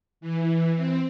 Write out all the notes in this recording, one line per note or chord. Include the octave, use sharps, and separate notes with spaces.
E3
C4